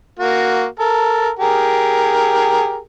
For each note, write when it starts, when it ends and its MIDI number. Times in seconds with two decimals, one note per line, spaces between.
0.19 0.66 58
0.19 0.66 66
0.79 1.31 69
0.79 1.31 70
1.39 2.80 67
1.39 2.80 68
1.39 2.80 70